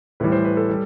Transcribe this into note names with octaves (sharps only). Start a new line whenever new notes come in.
A2 E3 G3 B4
C5
B4
A4
G3